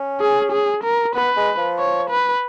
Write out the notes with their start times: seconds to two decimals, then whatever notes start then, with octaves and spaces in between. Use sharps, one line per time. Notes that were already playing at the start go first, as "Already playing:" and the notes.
Already playing: C#4
0.21 G#4
0.52 G#4
0.84 A#4
1.15 B3 B4
1.36 G#3
1.58 F3
1.79 C#5
2.10 B4